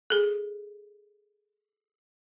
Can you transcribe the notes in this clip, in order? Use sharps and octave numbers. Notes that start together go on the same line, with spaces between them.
G#4 A4